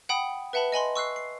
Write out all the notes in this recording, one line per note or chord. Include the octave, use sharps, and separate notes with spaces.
F#5 G5 B5 D#6
B4 E5 F#5 A5 B5
D#5 G#5 B5 C6
C#6 E6 F#6 C7
C7